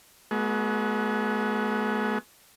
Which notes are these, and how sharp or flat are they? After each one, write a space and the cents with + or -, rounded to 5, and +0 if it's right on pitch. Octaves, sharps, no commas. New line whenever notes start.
G#3 +40 B3 -30 F#4 +0